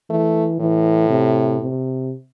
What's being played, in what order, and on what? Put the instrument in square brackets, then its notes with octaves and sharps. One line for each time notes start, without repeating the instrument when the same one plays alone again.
[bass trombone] E3 [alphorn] A3
[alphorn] A2 [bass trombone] E3
[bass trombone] C3
C3